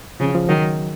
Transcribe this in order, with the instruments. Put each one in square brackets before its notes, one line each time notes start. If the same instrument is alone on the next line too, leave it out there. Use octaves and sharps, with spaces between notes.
[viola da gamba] C#3 [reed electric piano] F3
[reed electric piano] F3
[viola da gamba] D#3 [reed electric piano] F#3